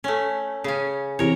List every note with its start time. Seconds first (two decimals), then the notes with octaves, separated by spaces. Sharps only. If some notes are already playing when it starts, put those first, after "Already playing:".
0.04 A3 C#4
0.64 C#3 C#4
1.19 C3 E3 G4 A#4 C#5